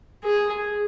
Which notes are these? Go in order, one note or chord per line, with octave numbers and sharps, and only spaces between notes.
G#4